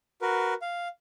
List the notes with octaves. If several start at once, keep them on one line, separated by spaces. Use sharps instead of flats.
F#4 A#4 B4
F5